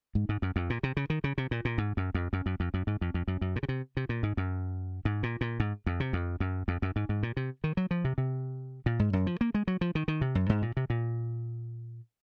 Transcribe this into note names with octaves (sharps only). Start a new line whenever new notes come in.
G#2
G#2
F#2
F2
A#2
C3
C#3
D#3
C#3
C3
A#2
A#2
G#2
F#2
F2
F#2
F#2
F2
F#2
G#2
F2
F2
F#2
F#2
A#2
C#3
C3
C3
A#2
G#2
F#2
G#2
A#2
A#2
G#2
F2
C3
F2
F#2
F2
F#2
G#2
G#2
A#2
C3
D#3
F#3
F3
C3
C3
A#2
G#2
F#2
F3
A#3
G#3
F#3
F3
D#3
D#3
C3
F#2
G#2
A#2
C3
A#2